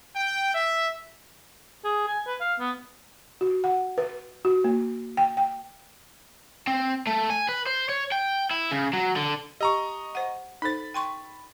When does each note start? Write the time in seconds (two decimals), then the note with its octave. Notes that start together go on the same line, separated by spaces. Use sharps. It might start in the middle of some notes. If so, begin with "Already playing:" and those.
0.16 G5
0.53 E5
1.84 G#4
2.08 G#5
2.27 B4
2.40 F5
2.60 B3
3.41 F#4
3.64 F#5
3.98 B4
4.45 F#4
4.64 A#3
5.17 G5
5.37 G5
6.67 C4
7.07 A3
7.30 G#5
7.49 B4
7.67 C5
7.89 C#5
8.12 G5
8.51 E4
8.71 C#3
8.93 F#3
9.16 D3
9.61 G4 D#5 A#5 C#6
10.15 C5 F#5
10.62 D#4 A4 C5 B5 A6
10.94 G5 C6 C#6